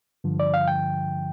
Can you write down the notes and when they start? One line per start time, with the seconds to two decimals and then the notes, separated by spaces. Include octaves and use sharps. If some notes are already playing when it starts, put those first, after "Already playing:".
0.24 G2 D3 F3
0.40 D5
0.54 F5
0.68 G5